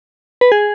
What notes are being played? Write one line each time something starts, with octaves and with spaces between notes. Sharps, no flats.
B4
G#4